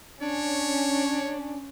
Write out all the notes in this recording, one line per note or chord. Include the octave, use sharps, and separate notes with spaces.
C#4 D4 C#5